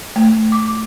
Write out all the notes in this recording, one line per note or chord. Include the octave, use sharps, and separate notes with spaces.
A3
D6